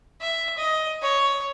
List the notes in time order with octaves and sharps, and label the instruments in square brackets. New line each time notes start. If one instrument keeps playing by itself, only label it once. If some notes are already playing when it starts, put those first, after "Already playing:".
[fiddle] E5
D#5
C#5